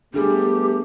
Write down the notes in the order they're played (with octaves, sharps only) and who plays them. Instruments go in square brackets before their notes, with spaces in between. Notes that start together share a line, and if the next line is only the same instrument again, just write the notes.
[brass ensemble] G3 A3 B3 [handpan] D4 G#4 [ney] G4